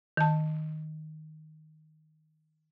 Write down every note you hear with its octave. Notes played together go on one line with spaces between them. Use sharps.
D#3 A5